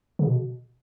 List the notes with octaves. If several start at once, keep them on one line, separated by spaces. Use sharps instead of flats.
C#3
B2